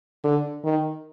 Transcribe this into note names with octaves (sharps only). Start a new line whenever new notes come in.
D3
D#3